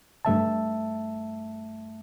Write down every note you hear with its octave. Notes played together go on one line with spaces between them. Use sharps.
G2 A3 E5 A5